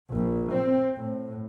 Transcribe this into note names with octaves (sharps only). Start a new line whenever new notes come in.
A#1
C4
A2